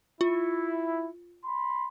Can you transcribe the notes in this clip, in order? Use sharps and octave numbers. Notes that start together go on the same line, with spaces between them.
E4 F4
B5 C6